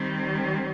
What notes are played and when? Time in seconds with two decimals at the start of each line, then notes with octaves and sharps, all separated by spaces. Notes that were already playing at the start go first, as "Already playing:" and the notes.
Already playing: D#3 G3 C4